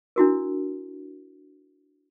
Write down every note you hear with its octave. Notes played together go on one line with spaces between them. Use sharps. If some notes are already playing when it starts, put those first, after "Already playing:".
D4 E4 F#4 A#4